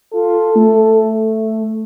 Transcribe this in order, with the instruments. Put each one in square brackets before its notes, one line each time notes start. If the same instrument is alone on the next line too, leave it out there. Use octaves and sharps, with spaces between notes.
[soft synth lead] F4 [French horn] A4
[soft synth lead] A3